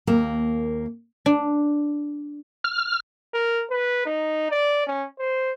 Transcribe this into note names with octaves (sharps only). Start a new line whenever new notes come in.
D#2 A#3
D4
F6
A#4
B4
D#4
D5
C#4
C5